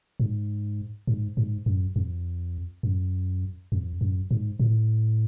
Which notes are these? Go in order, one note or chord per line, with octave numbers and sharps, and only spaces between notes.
G#2
G#2
G#2
F#2
F2
F#2
F2
F#2
G#2
A2